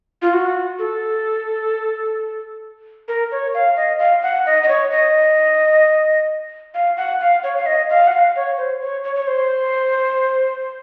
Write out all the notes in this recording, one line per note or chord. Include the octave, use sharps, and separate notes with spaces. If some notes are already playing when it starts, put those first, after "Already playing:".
F4
F#4
A4
A#4
C#5
F5
D#5
F5
F#5
D#5
D#5
C#5
D#5
F5
F#5
F5
C#5
F5
D#5
F5
F#5
F5
C#5
C5
C#5
C#5
C#5
C5